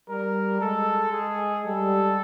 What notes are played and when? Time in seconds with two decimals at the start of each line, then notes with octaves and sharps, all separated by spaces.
0.09 G3 A#4
0.61 G#3 A4
1.12 G#4
1.65 G3 A4